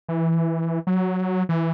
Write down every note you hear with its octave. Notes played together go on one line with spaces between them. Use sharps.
E3
F#3
E3